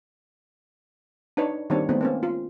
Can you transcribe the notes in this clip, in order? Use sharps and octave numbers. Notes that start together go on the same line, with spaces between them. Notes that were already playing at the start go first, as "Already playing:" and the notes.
D4 D#4 B4 C#5
D#3 G3 A#3 C4 D4 C#5
D#3 G#3 A3 B3 C4 B4
A#3 C4 C#4
F4